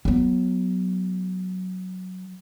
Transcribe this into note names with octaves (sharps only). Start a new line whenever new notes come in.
F#3 B3